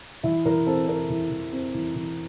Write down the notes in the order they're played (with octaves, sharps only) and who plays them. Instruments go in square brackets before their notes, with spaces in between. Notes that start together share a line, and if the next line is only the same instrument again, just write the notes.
[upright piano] E3 E5
E3 A#4
C4 A4
C4 A#4
E3
E3
C4
E3
E3